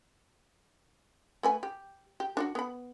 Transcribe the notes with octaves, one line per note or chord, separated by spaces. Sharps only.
A3 B4 G#5
G4
G4
D4 F4 F#4
B3 B5